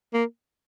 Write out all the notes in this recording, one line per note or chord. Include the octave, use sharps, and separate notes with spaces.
A#3